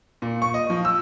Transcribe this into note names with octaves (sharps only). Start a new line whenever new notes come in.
A#2
C#6
D#5
F3
E6